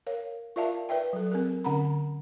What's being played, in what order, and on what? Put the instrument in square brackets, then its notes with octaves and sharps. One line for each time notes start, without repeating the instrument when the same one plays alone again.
[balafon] A#4 C#5 F5
F4 A#4 D5 E5 F5 A5
B4 D5 E5 G5
F#3 A4
C4 G#4 A#4
D3 C#4 F#5 A#5 B5